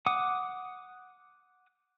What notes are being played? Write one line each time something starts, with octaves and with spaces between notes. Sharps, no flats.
F#5 D6 D#6